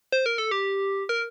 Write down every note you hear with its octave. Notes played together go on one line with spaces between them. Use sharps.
C5
A#4
A4
G4
A#4